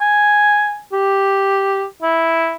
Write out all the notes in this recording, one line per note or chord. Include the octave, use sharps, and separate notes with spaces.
G#5
G4
E4